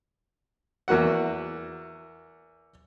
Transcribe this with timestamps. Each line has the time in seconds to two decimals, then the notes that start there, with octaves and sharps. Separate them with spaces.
0.88 E2 A#3 F#4 F#5